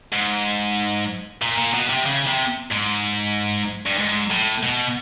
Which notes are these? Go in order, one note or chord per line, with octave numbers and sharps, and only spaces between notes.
G#2
A#2
A#2
B2
C3
C#3
C3
G#2
G2
G#2
A2
B2